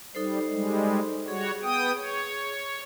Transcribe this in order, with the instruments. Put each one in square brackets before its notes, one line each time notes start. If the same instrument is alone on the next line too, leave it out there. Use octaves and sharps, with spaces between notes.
[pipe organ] G3 [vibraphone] D#4 A4 C5
[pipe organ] G3 G#3
[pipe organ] G3 F#4 C#5 [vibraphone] G#4
[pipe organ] B3 G5 D#6
C#5